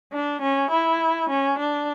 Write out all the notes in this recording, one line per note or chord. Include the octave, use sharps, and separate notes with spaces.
D4
C#4
E4
C#4
D4